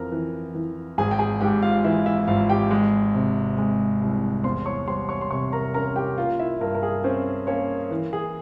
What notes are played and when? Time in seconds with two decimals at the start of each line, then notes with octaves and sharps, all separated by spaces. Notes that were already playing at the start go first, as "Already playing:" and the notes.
Already playing: F2 E3 A#4 A#5
0.12 E3
0.54 E3
0.98 G#1 G#4 G#5
1.11 G5
1.19 G#4 G#5
1.41 G#2 G4 G5
1.62 F4 F5
1.84 E3 E4 E5
2.06 E4 E5
2.28 G#1 F4 F5
2.50 G4 G5
2.71 G#3
3.14 C3
3.58 G#3
4.01 C2
4.44 E2 C5 C6
4.66 C#5 C#6
4.87 G3 C5 C6
5.09 C#5 C#6
5.21 C6
5.31 C3 C#5 C#6
5.53 A#4 A#5
5.74 C#4 A#4 A#5
5.96 G4 G5
6.18 A#3 F4 F5
6.39 E4 E5
6.61 G2 A#4
6.75 A#4
6.83 G#4
7.04 C4 C#4 C5
7.47 A#3 C#4 C#5
7.91 E3
8.13 G#4